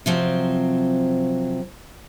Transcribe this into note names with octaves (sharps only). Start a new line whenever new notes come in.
C3 F3 F#3 C4